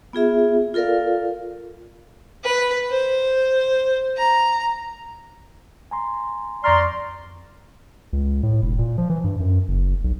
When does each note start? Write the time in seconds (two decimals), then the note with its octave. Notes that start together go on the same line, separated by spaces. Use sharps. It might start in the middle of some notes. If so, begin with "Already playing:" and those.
0.13 B3 F4 G#4 E5
0.74 F4 A4 A#4 D5 F5
2.44 B4
2.91 C5
4.17 A#5
5.91 G#5 A#5 C6
6.64 F2 D5 A#5 C6 C#6 F6
8.13 C#2
8.43 A2
8.62 E1
8.79 A#2
8.98 F3
9.09 E3
9.24 G2
9.40 F#2
9.68 F#1
10.04 B1